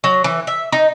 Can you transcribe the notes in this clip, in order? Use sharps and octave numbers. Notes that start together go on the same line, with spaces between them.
F#3
E3
E5
D#4